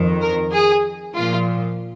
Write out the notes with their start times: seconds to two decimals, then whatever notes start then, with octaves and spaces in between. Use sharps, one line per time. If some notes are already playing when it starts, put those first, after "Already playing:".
Already playing: F2 D#3
0.21 A#4
0.52 G#4
1.15 A#2 F3 F4